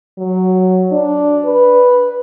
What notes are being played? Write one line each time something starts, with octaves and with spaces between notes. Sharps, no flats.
F#3
D4
B4